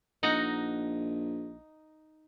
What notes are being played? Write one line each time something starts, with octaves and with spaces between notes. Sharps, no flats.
A#1 D#4 F#5 A#5